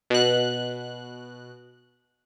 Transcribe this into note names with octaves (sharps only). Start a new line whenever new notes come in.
B2 F#6